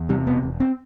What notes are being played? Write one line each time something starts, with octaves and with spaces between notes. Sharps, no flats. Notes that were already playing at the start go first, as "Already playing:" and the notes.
Already playing: E2
C3 G3
E1 B3
E1
C4